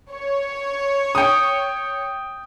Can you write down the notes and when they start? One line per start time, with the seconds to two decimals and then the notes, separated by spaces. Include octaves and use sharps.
0.12 C#5
1.15 G5 D#6